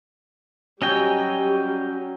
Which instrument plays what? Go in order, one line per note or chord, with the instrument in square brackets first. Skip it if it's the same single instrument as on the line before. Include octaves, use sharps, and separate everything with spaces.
[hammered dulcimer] F#3 G#5 [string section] G3 [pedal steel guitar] C#4 D#5 G5